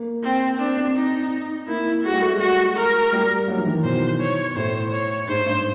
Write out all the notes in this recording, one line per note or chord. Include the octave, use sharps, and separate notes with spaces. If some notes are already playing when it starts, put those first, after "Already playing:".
Already playing: A#3
C4
C4 D4
C4
D#4
A#3 E4
G#3 F#4
G3
A3
G#3
F#4
A#4
G3
F#3
E3
D#3
B2 C5
C#5
A2 C5
C#5
G#2 C5
G2